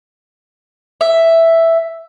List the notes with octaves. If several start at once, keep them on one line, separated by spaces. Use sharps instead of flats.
E5